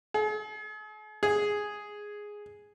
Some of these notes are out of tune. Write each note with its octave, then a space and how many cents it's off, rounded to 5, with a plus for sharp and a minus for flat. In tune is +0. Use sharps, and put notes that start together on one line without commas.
G#4 +45
G#4 +0